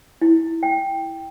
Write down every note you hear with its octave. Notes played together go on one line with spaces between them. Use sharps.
E4
G5